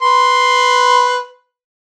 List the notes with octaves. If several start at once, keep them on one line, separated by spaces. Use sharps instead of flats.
B4 C6